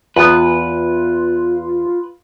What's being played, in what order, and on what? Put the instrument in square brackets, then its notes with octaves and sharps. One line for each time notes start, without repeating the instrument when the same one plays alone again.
[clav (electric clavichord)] E2 B3 [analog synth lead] F4 [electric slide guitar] B4